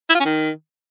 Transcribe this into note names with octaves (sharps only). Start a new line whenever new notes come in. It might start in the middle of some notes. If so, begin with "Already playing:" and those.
E4
F4
C#4
D#3